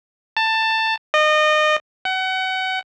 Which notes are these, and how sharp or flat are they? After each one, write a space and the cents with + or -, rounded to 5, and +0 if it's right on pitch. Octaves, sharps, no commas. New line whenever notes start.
A5 +15
D#5 -30
F#5 +30